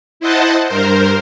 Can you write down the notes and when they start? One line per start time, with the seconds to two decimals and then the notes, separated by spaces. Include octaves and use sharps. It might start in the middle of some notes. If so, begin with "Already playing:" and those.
0.20 E4 C5 D#5 F#5 A5
0.68 G2 A#4 C5